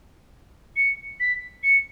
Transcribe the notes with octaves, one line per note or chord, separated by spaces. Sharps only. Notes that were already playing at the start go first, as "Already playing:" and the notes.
C#7
B6
C#7